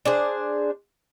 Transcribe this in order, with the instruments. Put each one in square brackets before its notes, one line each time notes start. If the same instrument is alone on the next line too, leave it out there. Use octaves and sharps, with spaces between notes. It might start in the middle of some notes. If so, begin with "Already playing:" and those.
[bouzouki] D4 G#4 C5